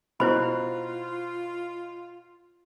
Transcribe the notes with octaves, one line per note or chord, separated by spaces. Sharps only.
B2 E4 F4 C5 B5